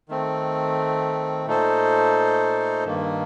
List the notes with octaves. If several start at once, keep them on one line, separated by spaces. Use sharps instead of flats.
D#3 A3 C4
A#2 A3 D#4 A4 C5
G2 D#3 A#3